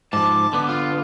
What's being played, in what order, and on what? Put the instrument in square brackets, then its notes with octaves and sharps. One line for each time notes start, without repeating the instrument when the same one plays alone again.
[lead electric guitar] G#2 F3 [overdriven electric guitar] A5 [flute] D6
[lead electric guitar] D3 B3
[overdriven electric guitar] F4